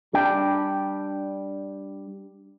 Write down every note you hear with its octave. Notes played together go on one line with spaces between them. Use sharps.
G3 D4 G5